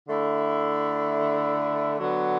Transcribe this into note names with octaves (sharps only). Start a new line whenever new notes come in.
D3 A3 E4
D3 F#3 B3